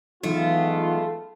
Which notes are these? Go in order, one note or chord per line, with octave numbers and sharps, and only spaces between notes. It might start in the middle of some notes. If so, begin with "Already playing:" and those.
E3 F#3 G#3 A3 B3 D#4 F4